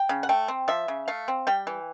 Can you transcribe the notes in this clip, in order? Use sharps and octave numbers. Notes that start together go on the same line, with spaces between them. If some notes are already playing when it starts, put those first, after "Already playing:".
Already playing: G5
C#3
F#5
A3 G5
C4
F3 E5
C#3
A3 F5
C4
G3 G5
E3